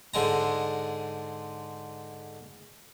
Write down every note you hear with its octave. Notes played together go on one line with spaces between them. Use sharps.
G#2 D3 G#3 A#5